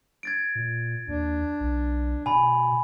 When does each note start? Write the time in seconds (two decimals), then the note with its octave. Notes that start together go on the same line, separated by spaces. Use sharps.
0.23 G#6 A6 D7
0.55 A#2
1.08 D#2 D4
1.60 B1
2.26 B2 G#5 B5